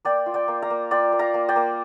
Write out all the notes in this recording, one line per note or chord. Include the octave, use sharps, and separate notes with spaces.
A#3 D5 G5
F4
D5 G5
A#3
F5 A#5
A#3
F4 D5 G5
A#3
F5 A#5
A#3
D5 G5
A#3